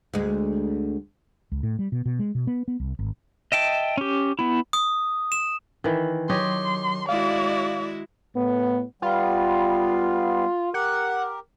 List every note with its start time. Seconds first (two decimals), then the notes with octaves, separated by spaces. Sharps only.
0.13 D2 G#3
1.52 C#2
1.63 A2
1.79 G3
1.92 B2
2.06 B2
2.19 G#3
2.35 B2
2.47 B3
2.68 B3
2.80 C2
2.99 G#1
3.52 D#5 E5 G5 A5
3.97 C#4 G4
4.39 B3 E4
4.73 D#6
5.32 E7
5.84 D#3 E3
6.29 F#3 G4 C#5 D#5 C6
7.09 G#3 E4 F#4 D5 F5
8.35 A2 B3
9.02 G3 B3 F4
10.74 G4 A#4 F#5